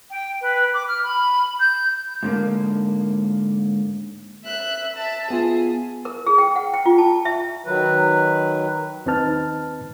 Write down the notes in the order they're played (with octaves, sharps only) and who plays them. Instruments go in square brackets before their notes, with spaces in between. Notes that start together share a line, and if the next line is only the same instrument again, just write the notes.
[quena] G5
B4
D6
F6
B5
G6
[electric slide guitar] G#2 D3 A#3
[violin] E5 F#6
E5 A5
[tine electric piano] B3 F4 [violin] G#4
[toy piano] A#4
G#4
G5
F#5
G5
F4
A5
E5
[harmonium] D#3 F#3 B4
[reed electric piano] D#2 C4 D#4 B4 A5 F6